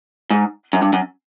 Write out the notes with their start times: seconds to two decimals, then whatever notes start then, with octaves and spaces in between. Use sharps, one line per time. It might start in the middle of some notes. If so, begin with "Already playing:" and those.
0.30 G#2
0.73 F#2
0.82 G2
0.93 F#2